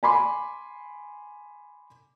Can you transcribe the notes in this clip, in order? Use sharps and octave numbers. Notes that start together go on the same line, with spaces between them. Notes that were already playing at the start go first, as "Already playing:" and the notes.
G#5 B5 C6 D6